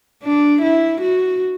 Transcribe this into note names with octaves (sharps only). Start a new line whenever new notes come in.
D4
E4
F#4